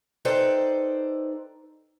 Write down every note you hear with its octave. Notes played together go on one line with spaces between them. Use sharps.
D#4 A4 B4 C5 D5 G5